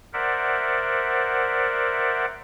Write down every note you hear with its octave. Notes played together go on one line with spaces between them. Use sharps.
A#4 C5 D5 E5 F#5